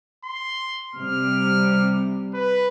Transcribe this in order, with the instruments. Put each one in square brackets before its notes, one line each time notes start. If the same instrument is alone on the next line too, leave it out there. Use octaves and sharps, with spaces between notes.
[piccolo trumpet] C6
[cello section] C3 G3 [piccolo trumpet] F6
[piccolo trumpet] B4